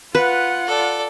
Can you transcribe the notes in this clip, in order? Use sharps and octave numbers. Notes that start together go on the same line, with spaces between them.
F4 B4 F#5
A4 D5